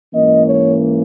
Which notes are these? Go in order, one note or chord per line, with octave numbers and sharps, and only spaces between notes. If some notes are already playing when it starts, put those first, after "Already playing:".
G#2 E3 A#3 C#4 D#5
C#5